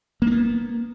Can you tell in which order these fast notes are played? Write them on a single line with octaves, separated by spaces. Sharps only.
A#3 D4 B3